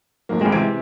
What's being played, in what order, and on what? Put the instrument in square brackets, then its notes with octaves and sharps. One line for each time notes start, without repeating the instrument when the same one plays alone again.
[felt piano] F2 G#2 F#3 [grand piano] A#3
[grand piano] A1 G#5 [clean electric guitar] G#3 C4 [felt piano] A3 F4 G#4
[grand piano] C3 E3 [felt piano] G#6 D7